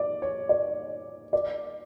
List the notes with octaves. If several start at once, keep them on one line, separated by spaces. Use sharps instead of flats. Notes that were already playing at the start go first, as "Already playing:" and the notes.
Already playing: D5
C#5
D5
D5